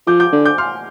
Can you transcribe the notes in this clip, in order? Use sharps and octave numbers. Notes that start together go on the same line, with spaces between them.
F3 D6 G6
D6 G6
D3
D6 G6
C6 F6